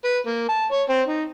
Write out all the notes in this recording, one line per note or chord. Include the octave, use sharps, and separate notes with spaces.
B4
A#3
A5
C#5
C4
D#4